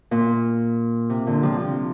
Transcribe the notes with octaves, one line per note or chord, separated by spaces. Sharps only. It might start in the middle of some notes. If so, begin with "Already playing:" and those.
A#2
C3
A#2 D3
C3 F3
C3 F3